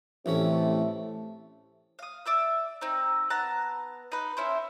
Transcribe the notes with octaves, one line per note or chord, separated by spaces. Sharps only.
A1 C3 E3 A3 C#4
F5 D#6
D5 E5 E6
C4 D#4
B3 A5 A#5 F#6
D#4 B4
C#4 E4 C5